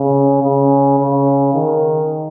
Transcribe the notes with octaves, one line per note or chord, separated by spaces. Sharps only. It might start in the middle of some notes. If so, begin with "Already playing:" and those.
Already playing: C#3
C#3
C#3
D#3